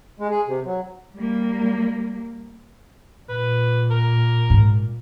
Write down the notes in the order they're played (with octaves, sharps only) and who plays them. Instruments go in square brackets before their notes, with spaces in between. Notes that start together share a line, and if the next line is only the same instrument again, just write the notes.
[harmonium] G#3
G#4
C3
F#3
[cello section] G3 A#3
[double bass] A#2 [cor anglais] B4
[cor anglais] A#4
[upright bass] G#2